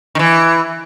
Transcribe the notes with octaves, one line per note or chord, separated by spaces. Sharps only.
D#3
E3